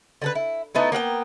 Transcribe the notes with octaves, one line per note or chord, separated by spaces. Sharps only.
D3 A4 B4
E4
A3 B3 D#4 E4
A#3 B3 F#5 G5